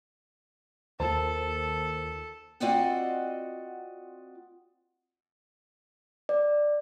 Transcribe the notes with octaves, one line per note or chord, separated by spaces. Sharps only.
D#2 F4 A4 A#4 C5 A5
C4 F4 F#4 D5 D#5 F#5
D5